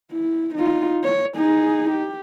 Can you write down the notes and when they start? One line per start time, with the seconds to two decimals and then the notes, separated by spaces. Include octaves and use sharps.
0.11 E4
0.55 D#4 F4
1.04 C#5
1.36 D#4 G#4
1.90 G4